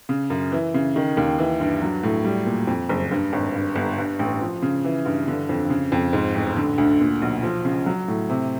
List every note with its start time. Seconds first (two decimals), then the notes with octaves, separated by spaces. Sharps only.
0.09 C#3
0.30 F#2
0.52 E3
0.74 C#3
0.96 D#3
1.17 D#2
1.39 E3
1.60 G2
1.82 F#3
2.03 A2
2.24 G3
2.46 A#2
2.67 F2
2.89 F#1
3.11 G2
3.33 G#1
3.54 G2
3.75 G1
3.98 G2
4.19 A1
4.41 F3
4.62 C#3
4.85 E3
5.05 G2
5.28 D3
5.49 F2
5.70 C#3
5.92 F2
6.13 G#2
6.35 A1
6.56 D3
6.78 D2
7.00 A#2
7.22 B1
7.43 F3
7.65 C#3
7.86 F#3
8.08 A2
8.30 C3